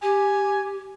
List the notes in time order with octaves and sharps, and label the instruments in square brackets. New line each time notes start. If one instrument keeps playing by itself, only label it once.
[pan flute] G4 [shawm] G#5